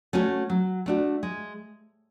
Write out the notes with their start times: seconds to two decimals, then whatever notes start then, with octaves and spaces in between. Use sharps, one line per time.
0.13 A3 C#4 F#4 C#5
0.50 F#3
0.86 A3 D4 F#4
1.23 G#3